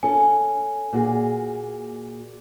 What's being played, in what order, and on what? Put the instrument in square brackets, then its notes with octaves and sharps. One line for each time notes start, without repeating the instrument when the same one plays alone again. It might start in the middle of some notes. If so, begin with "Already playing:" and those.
[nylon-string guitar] C#4 A4 [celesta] G#5
[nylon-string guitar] A#2 F#4 G#4